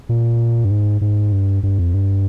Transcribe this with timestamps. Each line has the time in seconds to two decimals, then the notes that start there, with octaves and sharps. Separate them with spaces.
0.09 A#2
0.65 G2
0.71 G#2
1.01 G#2
1.32 G2
1.63 G2
1.78 F2
1.94 G2